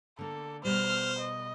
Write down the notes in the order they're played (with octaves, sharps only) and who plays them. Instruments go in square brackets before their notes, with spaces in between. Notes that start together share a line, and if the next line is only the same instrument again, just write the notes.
[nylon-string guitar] D3 A#3 [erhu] A4
[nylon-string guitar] B2 G3 [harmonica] C5 [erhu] F6
[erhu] D#5